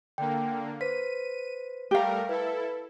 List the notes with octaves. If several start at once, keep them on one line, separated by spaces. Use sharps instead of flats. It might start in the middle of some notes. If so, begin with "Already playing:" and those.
D3 A#3 G5
B4 C5 B6 D#7
G3 A3 G4 A#4 F5
E4 A4 B4